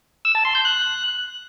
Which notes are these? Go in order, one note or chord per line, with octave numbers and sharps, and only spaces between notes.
E6
A5
C6
G6
F#6